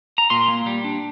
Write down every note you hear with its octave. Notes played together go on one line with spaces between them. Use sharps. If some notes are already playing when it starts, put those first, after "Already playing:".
A#5
A#2 C6
A#3
G3
D4